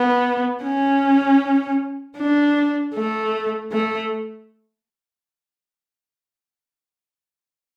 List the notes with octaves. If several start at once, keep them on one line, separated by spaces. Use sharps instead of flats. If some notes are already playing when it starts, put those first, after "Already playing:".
Already playing: B3
C#4
D4
A3
A3